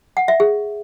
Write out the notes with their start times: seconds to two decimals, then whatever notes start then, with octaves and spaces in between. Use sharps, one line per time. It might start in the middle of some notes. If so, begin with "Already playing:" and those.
0.17 F#5
0.28 E5
0.40 G#4